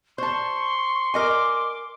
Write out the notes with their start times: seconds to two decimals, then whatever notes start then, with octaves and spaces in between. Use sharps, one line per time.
0.18 C5 A5 C6 C#6
1.14 A#4 D#5 G#5 D6